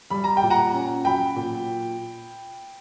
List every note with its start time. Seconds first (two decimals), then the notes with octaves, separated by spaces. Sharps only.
0.10 G3 B5
0.24 A#5
0.37 G5
0.43 A#2
0.50 F#5 A#5
0.73 C#4
1.05 F#3 G5 B5
1.36 A#2